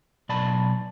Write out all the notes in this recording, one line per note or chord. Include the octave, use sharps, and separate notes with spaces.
B1 D5 A5 B5